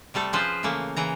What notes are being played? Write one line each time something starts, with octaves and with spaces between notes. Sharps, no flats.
C3 G3 A3 A4
F3 C#4 F4 G#4 B4 C5
C#3 E3 A3 A#3
C#3 E3 A#5